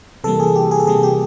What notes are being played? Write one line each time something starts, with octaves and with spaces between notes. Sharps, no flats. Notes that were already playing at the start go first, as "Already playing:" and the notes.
C3 E3 G3 A#3 A4
G#4
G4
G#4
A4
C3 E3 G3 A#3 G#4
G4